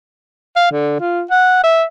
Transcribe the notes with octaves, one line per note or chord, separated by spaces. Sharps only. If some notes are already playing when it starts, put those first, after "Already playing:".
F5
D3
F4
F#5
E5